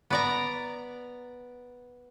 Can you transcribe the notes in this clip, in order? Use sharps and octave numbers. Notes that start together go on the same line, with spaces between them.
B3 D5 A#5